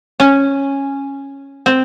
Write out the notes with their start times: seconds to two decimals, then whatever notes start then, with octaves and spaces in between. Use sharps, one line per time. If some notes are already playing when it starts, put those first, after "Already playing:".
0.20 C#4
1.66 C4